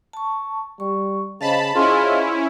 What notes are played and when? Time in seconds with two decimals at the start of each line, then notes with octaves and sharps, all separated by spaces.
0.13 A5 C#6
0.80 G3 C#6
1.41 C#3 C5 D#5 F5 A5 B5
1.75 C#4 E4 F4 G#4